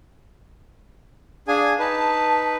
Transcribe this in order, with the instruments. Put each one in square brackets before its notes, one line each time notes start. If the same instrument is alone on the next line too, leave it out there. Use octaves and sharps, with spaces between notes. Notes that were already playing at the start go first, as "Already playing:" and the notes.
[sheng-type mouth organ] D4 G#4 G#5 [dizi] F5
[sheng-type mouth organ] D#4 B4 [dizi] A5